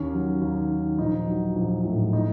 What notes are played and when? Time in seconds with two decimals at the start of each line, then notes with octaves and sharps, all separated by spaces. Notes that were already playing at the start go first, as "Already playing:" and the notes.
Already playing: D#2 C#4
0.13 F#3
0.41 D#2
0.70 D#3
0.98 A#1 D#4
1.27 F#3
1.56 A#1
1.85 A2
2.13 D#4